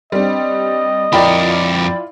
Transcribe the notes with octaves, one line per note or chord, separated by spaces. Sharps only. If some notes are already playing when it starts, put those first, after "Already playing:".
G3 C4 D4 D#5
F2 E4 F4 A#4 D5 G5 B5